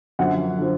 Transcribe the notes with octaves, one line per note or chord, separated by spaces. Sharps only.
F#2 D3 F3 F#5
D3 F3